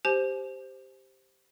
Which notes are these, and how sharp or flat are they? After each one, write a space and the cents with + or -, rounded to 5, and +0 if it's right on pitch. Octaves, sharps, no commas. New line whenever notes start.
G4 +0 C5 +0 G#5 +40